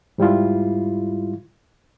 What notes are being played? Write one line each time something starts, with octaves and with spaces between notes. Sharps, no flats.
G#2 G3 E4 F4